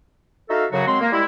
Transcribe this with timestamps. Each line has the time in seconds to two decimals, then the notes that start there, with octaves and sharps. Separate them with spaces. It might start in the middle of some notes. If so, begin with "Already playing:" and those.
0.49 D#4 F#4 A4 E5 F5
0.71 F#2 C#3 F#3 F#4
0.87 F#3 G#3 C4 C6
1.00 A#3
1.12 G3 G#3 E4